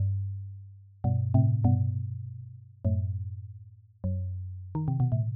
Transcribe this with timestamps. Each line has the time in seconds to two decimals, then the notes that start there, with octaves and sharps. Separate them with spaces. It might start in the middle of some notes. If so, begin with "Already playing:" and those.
Already playing: G2
1.04 G2 B2
1.34 A2 C3
1.64 G2 B2
2.85 F#2 A2
4.04 F#2
4.75 D#3
4.88 C3
5.00 B2
5.12 A2